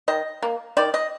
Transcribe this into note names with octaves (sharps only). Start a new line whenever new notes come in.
D#3 D#5
A#3
D#3 D5
D#5